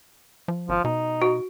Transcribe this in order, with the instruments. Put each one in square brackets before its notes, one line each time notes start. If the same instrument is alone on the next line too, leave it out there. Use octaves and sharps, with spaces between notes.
[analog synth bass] F3
[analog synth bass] G#1 [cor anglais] F3
[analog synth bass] B2 [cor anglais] D#4
[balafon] F#4